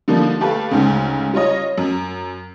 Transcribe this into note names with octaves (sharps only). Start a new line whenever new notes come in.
D3 F3 G3 A#3 D#4
A3 G4 A4 B4 F5
D2 G#2 C#3
G3 F4 C#5 D#5
F#2